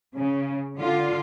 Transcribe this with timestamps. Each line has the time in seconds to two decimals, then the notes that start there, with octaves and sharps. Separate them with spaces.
0.15 C#3
0.78 D3 F4